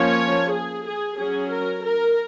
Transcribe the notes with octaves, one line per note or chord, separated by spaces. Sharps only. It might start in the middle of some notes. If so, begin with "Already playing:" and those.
Already playing: F3 A#3 C#4 C#5
G#4
G#4
F#3 C#4 G#4
A#4
A#4